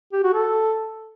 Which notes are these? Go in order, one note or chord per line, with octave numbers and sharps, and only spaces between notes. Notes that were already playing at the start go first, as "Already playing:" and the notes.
G4
F#4
A4